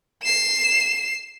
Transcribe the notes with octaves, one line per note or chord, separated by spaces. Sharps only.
C7 E7